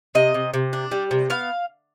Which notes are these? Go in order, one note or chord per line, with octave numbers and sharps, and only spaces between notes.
C3 D#5
C3
C3
D4
G3
C3
B3 F5